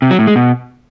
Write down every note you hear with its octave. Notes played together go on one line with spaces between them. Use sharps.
C3
F#3
A2
G#3
B2